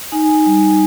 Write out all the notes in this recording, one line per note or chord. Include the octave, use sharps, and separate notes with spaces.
D#4 G#5
G3